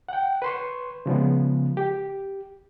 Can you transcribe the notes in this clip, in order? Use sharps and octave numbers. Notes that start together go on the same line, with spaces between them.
F#5 G5
B4 C6 C#6
C#3 F3 G#3 B3
G4